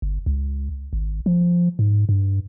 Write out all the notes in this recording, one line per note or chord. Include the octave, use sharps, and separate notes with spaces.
G1
C#2
G#1
F3
G#2
G2